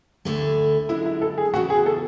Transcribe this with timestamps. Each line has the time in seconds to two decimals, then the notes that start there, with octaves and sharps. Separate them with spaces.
0.25 D2 D3 A3 E4
0.89 F#2 D3 G#3 E4
1.06 E4
1.22 A4
1.38 G#4
1.54 E2 C#3 E3 F#4
1.70 G#4
1.86 A4